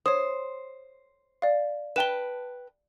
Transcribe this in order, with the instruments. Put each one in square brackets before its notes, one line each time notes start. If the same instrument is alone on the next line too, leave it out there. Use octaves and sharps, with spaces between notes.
[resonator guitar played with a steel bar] C5 [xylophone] C#5 D#6
[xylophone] D5 F5
[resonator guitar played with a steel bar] B4 G5 A5 [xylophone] E7 G7